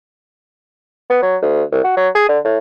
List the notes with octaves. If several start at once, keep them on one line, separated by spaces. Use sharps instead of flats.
B3
F#3
D2
C2
F#4
F#3
G#4
D3
A2